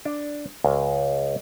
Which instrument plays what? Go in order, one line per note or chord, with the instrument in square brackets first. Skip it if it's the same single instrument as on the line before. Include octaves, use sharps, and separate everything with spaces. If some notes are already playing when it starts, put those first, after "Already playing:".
[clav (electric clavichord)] D4
C#2